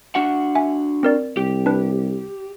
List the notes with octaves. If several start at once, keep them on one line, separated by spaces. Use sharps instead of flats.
D4 F#4 F#5
E5 G#5
C4 A#4 D5
C2 G4
D4 B4